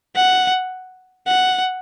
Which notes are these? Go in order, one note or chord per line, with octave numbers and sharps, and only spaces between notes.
F#5
F#5